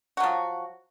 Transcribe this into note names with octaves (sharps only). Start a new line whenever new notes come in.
F3 F#3 F#4